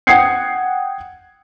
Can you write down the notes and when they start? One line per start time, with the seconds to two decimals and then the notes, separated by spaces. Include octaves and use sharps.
0.07 F#5 G5 D#6 G#6 C7 C#7